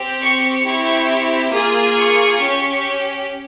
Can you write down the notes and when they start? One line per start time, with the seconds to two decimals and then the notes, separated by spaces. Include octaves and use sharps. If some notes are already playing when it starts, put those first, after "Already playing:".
Already playing: C4 G4
0.21 C#6
0.65 C4 E4 G4 C#6
1.52 A#3 F4 G#4
1.96 C#6
2.39 C#4 G4